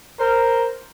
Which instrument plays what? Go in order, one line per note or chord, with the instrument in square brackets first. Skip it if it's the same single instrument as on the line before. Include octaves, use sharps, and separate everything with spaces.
[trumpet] A#4 [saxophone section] C5